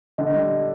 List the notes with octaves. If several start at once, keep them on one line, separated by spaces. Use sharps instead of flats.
D3 D#5
G3